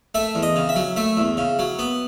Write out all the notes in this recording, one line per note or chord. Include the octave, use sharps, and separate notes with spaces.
A3 E5
E2
D#5
C#3
E5
F#3
A3 E5
E2
C#3
F#3
B3